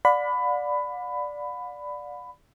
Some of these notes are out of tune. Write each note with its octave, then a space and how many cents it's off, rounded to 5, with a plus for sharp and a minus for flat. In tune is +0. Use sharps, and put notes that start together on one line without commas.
D5 +0 F#5 -45 B5 +15